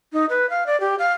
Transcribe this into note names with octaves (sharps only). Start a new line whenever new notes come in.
D#4
B4
F5
D5
G4
F5